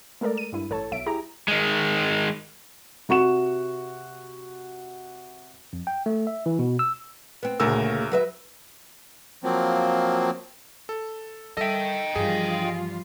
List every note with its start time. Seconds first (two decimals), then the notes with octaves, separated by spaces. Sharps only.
0.21 G#3 A3 A4 A#4 D5
0.37 D#7
0.52 G2 E4
0.70 A1 A4 C#5 A5
0.91 B1 F#3 E5 D7
1.06 E4 G4 G#4 A#5
1.48 D#3 G#3
3.09 C3 F#4 C#6 E7
5.73 F2
5.87 G5
6.06 A3
6.27 E5
6.46 E3
6.59 B2
6.79 E6
7.43 B3 C4
7.60 D2 A#2 C#3 A3 A#4 E6
8.12 F#3 B4 E5
9.44 F3 F#3 A#3 C4
10.89 A4
11.57 G3 A4 D#5 E5 G5
12.16 G2 E3 F3 G3 F4 G#4